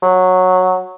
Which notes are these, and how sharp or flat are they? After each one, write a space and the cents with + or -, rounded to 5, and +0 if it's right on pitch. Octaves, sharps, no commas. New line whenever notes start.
F#3 -10